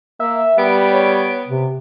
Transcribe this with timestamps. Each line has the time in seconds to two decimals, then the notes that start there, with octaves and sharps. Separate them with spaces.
0.20 A#3 E5
0.58 G3 B3 D7
0.91 C#5
1.47 C3